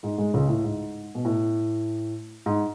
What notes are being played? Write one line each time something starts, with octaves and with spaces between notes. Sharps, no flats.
G#2 G#3
G#2 G#3
C#2 C#3
A2
G#2
B2
A2
G#2